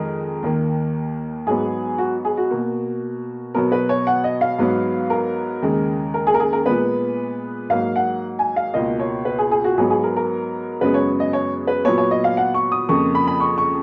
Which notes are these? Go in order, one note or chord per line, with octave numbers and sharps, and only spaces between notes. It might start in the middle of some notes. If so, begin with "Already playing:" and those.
Already playing: F2 D#3 G#3 A#4
D#2 D#3 A#3
G#2 F#3 B3 G#4
F#4
G#4
F#4
B2 A#3
B2 F#3 B3 A#4
B4
C#5
F#5
D#5
F5
G#2 F#3 B3
A#4
D#2 C#3 G#3
A#4
G#4
A#4
G#4
A#4
A#2 G#3 B3 B4
G#2 F#3 A#3 F5
F#5
G#5
F5
C#2 B2 A#3 D#5
C#5
B4
G#4
G#4
F#4
G#2 F#3 B3 G#4
G#4
A#4
A#4
F#2 C#3 G#3 B3 B4
C#5
D#5
C#5
B4
A#2 F#3 B3 C#5
C#5
D#5
F5
F#5
C#6
D#6
F2 C#3 F3 A#3 C#6
B5
B5
C#6
C#6